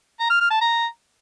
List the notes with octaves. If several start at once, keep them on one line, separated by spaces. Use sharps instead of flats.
A#5
F6
F6
A5
A#5